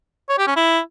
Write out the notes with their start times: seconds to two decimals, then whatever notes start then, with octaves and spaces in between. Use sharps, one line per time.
0.29 C#5
0.38 G4
0.47 C#4
0.56 E4